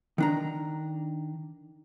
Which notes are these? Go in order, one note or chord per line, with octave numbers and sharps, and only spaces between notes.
D#3 D4 A#5